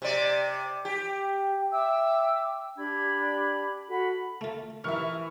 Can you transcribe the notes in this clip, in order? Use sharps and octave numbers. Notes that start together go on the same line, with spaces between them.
C3 D5
G4
E5 G5 D6 E6
D4 G4 B5 G#6
F#4 A4 B5
A3 F4
D#3 E3 E5 C#6 F6